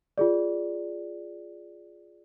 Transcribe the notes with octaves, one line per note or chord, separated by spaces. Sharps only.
F4 G#4 D5